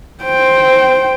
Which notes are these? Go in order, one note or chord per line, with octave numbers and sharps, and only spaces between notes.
C5 G5